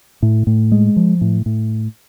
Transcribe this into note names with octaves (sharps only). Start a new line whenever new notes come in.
A2
A2
G#3
F3
A2
A2